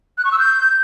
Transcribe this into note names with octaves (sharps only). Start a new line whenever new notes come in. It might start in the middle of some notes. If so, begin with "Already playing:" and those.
F#6
C#6
E6
G6